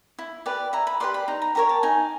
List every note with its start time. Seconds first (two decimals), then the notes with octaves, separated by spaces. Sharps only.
0.19 E4
0.46 G4 B4 D5
0.73 E4 A#5
0.87 B5
1.00 G4 B4 D5 C6
1.14 B5
1.28 D#4 A#5
1.42 A#5
1.55 G4 A#4 C#5 A#5
1.69 A5
1.83 D#4 G#5